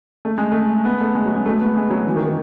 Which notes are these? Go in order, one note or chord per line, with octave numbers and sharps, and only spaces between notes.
A3
G#3
A3
B3
A3
G#3
F#3
G#3
A3
B3
G#3
F#3
E3
D#3
D#3